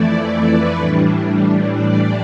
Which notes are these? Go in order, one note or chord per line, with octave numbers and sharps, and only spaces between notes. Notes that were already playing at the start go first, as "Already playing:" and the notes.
Already playing: F2 E3 A3 E4 D5
B4
A2 E3 G3 D4 A4
D5